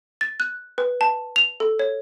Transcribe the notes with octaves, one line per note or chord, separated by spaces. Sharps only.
A6
F#6
B4
A5
F7
A4
C#5